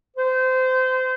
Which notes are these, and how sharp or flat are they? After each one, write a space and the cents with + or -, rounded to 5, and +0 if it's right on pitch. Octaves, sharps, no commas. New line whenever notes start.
C5 -25